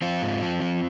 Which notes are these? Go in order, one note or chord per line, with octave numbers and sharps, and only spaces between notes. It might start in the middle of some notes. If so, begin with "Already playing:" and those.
F3 C4 F4
G#2
F3
F3